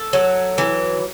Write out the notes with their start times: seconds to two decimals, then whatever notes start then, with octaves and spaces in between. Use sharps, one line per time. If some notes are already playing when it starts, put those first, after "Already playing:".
Already playing: A4
0.13 F#3
0.58 E3